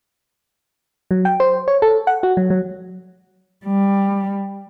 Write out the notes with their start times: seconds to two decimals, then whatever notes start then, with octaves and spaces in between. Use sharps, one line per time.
1.11 F#3
1.25 G5
1.40 C5
1.68 C#5
1.82 A4
2.07 F#5
2.23 F#4
2.37 F#3
2.50 F#3
3.66 G3